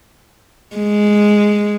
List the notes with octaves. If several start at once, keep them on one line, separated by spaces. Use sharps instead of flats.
G#3